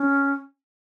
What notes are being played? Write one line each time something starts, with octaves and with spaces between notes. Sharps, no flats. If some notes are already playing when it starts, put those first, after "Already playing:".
Already playing: C#4